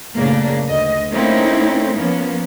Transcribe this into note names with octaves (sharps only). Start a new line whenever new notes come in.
F#2 A2 C#3 A3 A#3 D4
D2 D#5
A3 A#3 C4 C#4 D#4 E4
F3 A#3 B3 C#4